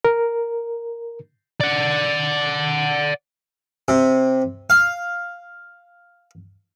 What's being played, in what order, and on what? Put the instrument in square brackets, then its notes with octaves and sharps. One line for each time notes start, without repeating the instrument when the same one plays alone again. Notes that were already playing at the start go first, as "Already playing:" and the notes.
[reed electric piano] A#4
[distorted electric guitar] D5 F#5
[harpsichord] C3
F5